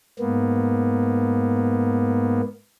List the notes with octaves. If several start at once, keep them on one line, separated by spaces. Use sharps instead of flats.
G#2 A#3 B3